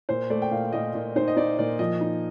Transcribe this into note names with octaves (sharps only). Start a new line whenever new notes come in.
A#2 C5
A3 D5
G5
A#2 F5
A#2 D#5
A#2
D#4 C5
D#5
D#4 D5
A#2 D5
F3 D#5
D#4